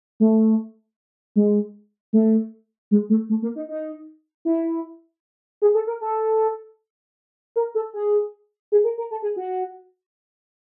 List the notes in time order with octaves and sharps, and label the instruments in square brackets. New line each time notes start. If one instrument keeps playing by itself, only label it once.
[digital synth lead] A3
G#3
A3
G#3
A3
A3
A#3
D#4
D#4
E4
G#4
A4
A#4
A4
A#4
A4
G#4
G#4
A#4
A#4
A4
G#4
F#4